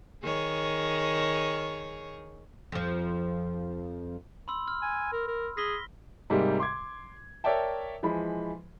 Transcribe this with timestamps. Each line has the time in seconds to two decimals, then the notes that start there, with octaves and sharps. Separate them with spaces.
0.23 D#3 G#4 C#5
2.72 F2 F3
4.48 B5 C6 E6
4.68 F6
4.82 G#5
5.13 A#4
5.28 A#4
5.57 G#4 A#6 B6 G7
6.30 G#2 C3 G3 G#3 A#3 G4
6.60 C6 D6 G#6
7.44 A#4 C#5 D5 E5 G5 A5
8.03 E3 F3 G#3 B5